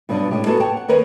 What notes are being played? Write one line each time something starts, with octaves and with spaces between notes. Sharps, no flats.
G2 B2 F#3 B3 D4
A2 G#3 G4
A#3 B3 F#4 G#4 A4
G4 C#5 F#5 G5 A5
F#5
D#2 A#4 B4 C#5